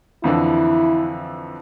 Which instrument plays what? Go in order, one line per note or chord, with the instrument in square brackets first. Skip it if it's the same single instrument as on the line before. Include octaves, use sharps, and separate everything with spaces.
[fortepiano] F2 D3 E3 [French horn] E4